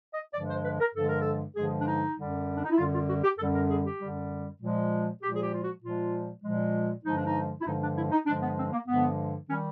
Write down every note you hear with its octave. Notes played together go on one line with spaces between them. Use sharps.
D#5
G2 D3 F3 G#3 D5
C5
B4
A#4
G2 D3 F3 G#3 A4
A#4
A4
G2 D3 F3 G#3 G#4
D4
D#4
F#2 D3 G3
D4
D#4
E4
F#2 D3 G3 F4
F4
F#4
G4
F#2 D3 G3 A4
A#4
G#4
G4
F#2 D3 G3
A#2 F3 G#3
A#2 F3 G#3 G4
G#4
G4
F4
F#4
A#2 F3 G#3 F4
A#2 F3 G#3
G2 D3 F3 G#3 D#4
D4
D#4
E4
G2 D3 F3 G#3 D#4
D4
E4
D#4
G2 D3 F3 G#3 D4
B3
C4
A#3
G2 D3 F3 G#3 B3
D#3 G3 C#4